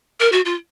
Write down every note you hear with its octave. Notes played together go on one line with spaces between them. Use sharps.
A#4
F#4
F4